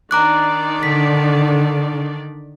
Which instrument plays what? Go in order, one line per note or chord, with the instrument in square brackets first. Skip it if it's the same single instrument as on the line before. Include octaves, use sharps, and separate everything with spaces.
[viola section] D#3 D4 D5 [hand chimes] A#5 D6 F#6
[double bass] D3 [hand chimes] B6